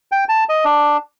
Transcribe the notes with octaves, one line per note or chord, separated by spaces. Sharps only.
G5
A5
D#5
D4